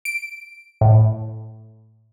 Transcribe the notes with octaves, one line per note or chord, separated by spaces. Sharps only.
D7
A2